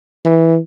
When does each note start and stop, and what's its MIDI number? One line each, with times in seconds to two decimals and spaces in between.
0.25 0.58 52